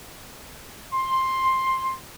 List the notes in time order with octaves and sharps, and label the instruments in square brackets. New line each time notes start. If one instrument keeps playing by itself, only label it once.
[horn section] C6